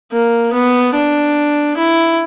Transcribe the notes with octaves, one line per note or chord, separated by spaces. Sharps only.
A#3
B3
D4
E4